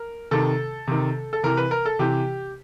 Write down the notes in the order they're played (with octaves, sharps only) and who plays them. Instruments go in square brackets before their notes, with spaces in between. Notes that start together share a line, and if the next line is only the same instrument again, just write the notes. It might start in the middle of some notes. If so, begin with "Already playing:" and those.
Already playing: [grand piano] A#4
C3 D#3 A4
C3 D#3
A4
C3 E3 A#4
B4
A#4
A4
C3 E3 G4